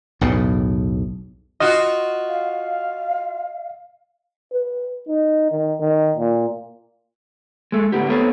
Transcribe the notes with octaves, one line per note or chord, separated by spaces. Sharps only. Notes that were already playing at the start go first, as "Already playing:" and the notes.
B1 E2 A2
F4 F#4 D#5
F5
B4
D#4
D#3
D#3
A#2
G#3 A3
D2 A2 B3 G4
B3 C4 A4 B4 C#5